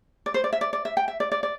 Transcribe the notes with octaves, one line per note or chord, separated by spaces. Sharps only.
D5
C5
D5
E5
D5
D5
E5
G5
E5
D5
D5
D5